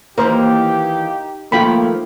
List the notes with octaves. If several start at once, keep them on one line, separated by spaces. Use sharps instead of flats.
D#2 E3 A#3 D#4 G4 A#4 C5
D#3 F3 A3 A#3 F4 G5 B5